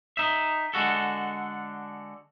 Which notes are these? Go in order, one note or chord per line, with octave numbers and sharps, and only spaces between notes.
D#4 E5
D3 G#3 F#4 A4